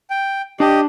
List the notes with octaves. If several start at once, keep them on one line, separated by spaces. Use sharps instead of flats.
G5
D4 G4 D5 D#5 A5